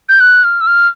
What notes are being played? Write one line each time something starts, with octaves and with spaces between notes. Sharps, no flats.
G6
F#6
F6
E6
F6